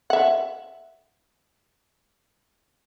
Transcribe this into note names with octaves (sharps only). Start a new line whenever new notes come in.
E5 F#5